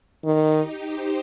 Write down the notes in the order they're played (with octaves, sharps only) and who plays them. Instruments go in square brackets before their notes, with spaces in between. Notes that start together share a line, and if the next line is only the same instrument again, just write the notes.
[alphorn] D#3 [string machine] D#4
[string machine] G4
C5